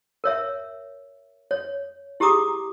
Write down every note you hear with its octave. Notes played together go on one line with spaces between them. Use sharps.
A#4 C#5 E5
C#5
E4 G4 G#4 A#5 D6 D#6